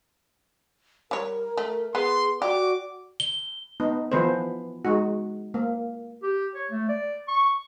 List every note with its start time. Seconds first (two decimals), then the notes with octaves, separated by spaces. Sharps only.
1.11 G3 A#4 C#5
1.58 A3
1.95 B3 G#4 C6
2.42 F#4 G4 D5 D6
3.20 G7
3.80 B3 D#4
4.12 E3 F3 B3 B4 C5
4.85 G#3 D#4 F#4
5.54 A#3
6.23 G4
6.55 C#5
6.72 A3
6.89 D5
7.28 C#6